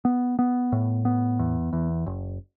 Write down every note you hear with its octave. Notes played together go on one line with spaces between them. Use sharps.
B3
B3
A2
B3
E2
E2
F#1